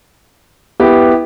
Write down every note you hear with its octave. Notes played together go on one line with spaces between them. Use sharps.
B3 E4 G4